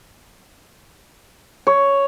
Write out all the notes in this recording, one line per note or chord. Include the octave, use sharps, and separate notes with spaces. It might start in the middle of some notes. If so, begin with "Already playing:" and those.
C#5